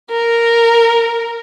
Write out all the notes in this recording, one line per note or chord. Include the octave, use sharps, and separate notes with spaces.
A#4